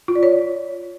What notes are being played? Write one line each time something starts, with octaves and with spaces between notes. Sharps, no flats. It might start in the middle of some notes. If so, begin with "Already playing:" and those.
F4
D5
C#5